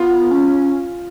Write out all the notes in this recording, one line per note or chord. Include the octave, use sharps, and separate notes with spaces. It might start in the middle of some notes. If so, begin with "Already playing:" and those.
Already playing: B3 F4
C#4